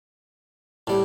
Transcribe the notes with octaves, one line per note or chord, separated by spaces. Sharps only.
A2 G3